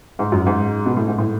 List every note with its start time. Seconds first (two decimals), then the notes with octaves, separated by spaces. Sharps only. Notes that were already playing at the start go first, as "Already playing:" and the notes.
0.19 G#2
0.32 F#2
0.46 G#2
0.86 B2
0.97 A2
1.08 G#2
1.18 A2